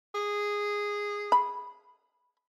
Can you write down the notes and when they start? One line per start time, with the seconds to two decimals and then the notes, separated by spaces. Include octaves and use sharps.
0.15 G#4
1.32 B5